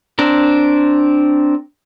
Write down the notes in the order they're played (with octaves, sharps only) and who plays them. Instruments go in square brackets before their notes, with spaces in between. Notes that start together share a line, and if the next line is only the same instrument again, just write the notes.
[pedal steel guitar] C4 D4 A#4